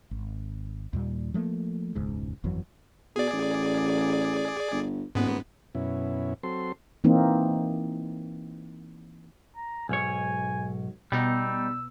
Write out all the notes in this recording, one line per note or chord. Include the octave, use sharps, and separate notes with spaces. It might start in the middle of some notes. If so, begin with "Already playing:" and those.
G#1
D#2 A#2 G3
F3 F#3 A3 A#3
E1 C#2 G#2
G1 F2 E3 F#3
B2 G#4 D5
A1
G1
D#1 G#2 B3
F#2 B2 C#4 E4
F#3 C4 A4 C6
E3 A#3 C4 D#4
A#5
B1 G#2 C#5 G#5
B2 G3 B3 D#4 E6